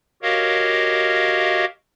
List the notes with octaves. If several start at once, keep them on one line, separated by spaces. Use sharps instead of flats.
F#4 G4 A#4 C#5 D#5 F5